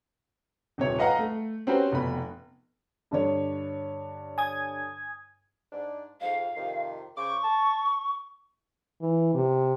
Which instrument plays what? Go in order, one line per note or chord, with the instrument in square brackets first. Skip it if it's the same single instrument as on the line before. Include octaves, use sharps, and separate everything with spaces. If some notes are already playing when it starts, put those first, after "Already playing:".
[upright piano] D#1 C3 C#5
B4 D#5 F5 F#5 A#5
A3
C4 C#4 F#4 G4 B4 C5
F1 B2 B3 B5
[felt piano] G2 D3 C#5
[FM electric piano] G#5 D#6 G#6
[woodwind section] G#2 D4
[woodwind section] F2 G#2 [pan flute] F5
[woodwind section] F2 C3 D#3
[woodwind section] C#3 C5 D6 [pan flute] C#6
[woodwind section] A5
[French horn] E3
C3